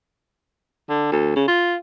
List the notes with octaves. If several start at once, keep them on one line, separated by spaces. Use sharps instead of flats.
D3
D2
C#3
F4